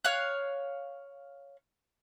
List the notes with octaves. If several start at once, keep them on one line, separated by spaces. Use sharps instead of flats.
C#5 F5 F#6